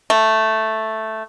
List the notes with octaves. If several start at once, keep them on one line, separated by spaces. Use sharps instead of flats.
A3